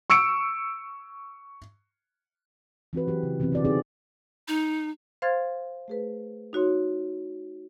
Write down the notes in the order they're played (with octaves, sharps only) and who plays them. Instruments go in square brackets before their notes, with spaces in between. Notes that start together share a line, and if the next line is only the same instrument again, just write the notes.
[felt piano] C#6 E6 C#7 D7
[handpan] E3 C4 F#4 B4
E3 F#3 G4
C#3
C3 E3 B3 C4
D3 C4 F#4 D5
C4 D#4 G4 G#4 D5
[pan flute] D#4
[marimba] C5 F5 C6 F6 G#6 A6
A3 G#4 B4
D#4 F#4 C#5 C6